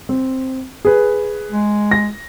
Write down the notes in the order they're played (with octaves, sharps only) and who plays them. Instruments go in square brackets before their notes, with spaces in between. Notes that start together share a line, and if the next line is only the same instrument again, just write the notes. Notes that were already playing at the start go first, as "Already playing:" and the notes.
[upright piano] C4
G#4 B4
[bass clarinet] G#3
[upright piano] A#6